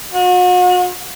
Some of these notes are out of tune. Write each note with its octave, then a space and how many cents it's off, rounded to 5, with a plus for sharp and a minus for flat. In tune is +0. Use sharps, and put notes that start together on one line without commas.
F#4 -40